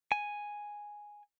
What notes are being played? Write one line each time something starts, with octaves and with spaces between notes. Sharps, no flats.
G#5